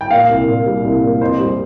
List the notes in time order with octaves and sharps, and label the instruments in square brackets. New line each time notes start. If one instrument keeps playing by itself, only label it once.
[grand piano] G5
A#2 F5
C2
A#2
G3
C2
A#2
F2 C5
G3